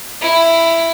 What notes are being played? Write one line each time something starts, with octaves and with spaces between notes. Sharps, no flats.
E4